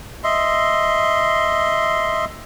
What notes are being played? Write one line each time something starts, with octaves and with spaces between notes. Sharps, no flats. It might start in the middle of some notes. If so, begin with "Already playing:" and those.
D#5 E5 C6